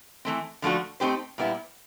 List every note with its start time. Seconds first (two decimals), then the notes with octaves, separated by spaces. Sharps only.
0.25 E3 A3 C4
0.62 D3 F3 A3 D4 F#4
1.00 A3 C4 D#4 G4 C5
1.38 A#2 G3 B3 E4